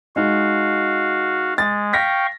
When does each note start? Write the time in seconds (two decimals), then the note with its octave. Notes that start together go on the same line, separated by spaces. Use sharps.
0.16 G#3 D#4 F#4 F5
1.58 G#3 A6
1.93 F5 G5 C#6 A#6 B6